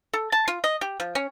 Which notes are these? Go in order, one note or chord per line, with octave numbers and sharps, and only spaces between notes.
A4
A5
F4
D#5
G4
F3
C#4